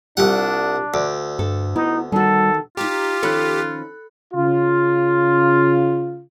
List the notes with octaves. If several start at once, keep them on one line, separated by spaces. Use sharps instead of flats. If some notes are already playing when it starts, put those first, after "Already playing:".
C2 G3 D4 F4 G4 F#5
D2 D5
G2 A4
B3 D#4 E4
D#3 G3 F#4 A4
D#4 F4 G4 A#5
D#3 F3 C#4 A4 B5 F#6
C#3 F4